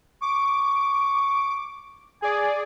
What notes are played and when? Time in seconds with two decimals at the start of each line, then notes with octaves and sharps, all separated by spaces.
0.22 C#6 D6
2.22 G#4 D5 G#5